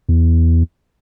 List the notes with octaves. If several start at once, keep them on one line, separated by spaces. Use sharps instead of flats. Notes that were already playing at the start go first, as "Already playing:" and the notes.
E2